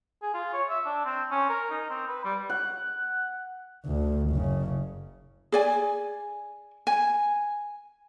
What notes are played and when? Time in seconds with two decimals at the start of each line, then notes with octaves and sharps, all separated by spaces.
0.22 G#4
0.34 F4
0.53 C#5
0.69 E5
0.85 D4
1.05 C4
1.31 C#4
1.49 A#4
1.70 D#4
1.90 C4
2.08 B4
2.25 G3
2.50 F#5
3.86 D2
4.30 F#1 C#3
5.52 G#4 D5 G#5
6.87 G#5